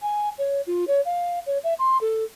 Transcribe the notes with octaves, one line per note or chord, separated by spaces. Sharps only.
G#5
C#5
F4
C#5
F5
C#5
E5
C6
A4